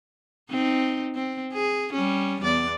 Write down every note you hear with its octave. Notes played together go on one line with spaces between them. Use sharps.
C4 D#4
C4
G#4
G3 C#4
E2 D5